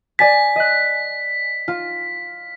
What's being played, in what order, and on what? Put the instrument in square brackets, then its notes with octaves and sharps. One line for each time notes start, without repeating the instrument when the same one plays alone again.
[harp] D5 G#5 A6 [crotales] B6
[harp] D#5 F#6
F4